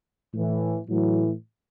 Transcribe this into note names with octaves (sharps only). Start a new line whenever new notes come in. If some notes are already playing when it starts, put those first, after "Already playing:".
A2 E3
A2 E3 F#3